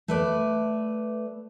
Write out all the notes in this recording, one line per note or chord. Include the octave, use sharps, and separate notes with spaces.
A3 B4 D5